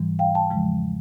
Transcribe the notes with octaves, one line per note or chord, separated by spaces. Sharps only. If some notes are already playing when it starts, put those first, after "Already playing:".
Already playing: G#2 E3 G3
F5 G5
G5 A5
E2 C#3 F3 G#3